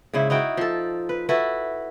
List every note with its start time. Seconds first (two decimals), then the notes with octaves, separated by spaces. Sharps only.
0.13 G#2 C#3 E4
0.30 D#4 E4 F#4 G5
0.57 F3 A4
1.09 B4
1.29 E4 F#4 A4 B4